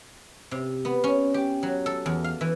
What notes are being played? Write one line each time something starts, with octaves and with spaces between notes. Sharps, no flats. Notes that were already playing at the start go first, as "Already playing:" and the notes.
C3
B3
C#4
G4
F#3
A4
E2
F5
E3